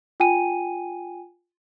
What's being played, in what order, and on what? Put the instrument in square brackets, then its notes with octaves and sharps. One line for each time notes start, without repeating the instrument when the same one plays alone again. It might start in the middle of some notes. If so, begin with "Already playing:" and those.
[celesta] F4 G5 G#5 D#7